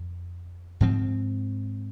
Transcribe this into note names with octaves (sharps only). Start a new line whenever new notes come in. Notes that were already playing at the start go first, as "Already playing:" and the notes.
Already playing: F2
G#2 F3 C4